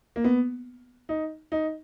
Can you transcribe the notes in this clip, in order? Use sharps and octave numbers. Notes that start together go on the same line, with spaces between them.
A#3
B3
D#4
D#4